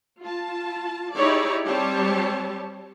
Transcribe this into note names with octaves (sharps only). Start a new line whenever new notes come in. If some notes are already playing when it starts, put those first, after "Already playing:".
F4 A5
D#4 E4 G4 G#4 C#5 D5
G3 C4 G4 C#5 A5